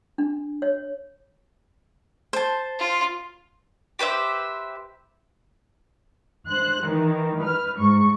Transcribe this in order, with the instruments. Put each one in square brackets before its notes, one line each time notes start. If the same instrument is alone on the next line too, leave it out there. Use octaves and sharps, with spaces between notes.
[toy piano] D4
C#5
[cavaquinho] C5 A5
[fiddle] F4
[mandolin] G4 B4 C5 E5
[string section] C5 F#6
D#3 E3
B4 F6
G#2 C#6